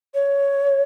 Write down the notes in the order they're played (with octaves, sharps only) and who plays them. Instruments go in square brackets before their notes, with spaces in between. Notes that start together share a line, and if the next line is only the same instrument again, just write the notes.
[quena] C#5